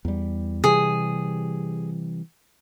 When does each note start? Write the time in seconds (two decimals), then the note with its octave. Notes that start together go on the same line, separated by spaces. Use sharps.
0.05 E2 G3
0.64 C3 E3 G3 G#4